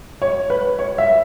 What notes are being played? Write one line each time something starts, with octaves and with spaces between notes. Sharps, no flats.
C#5
B4
C#5
E5